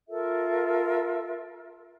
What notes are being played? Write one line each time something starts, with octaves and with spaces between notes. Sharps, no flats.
F4 A4 A#4 E5